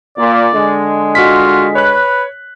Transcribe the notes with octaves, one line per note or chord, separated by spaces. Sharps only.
A#2 D5
D3 G#3
F4 F#4 B6
B4 C#5 F#6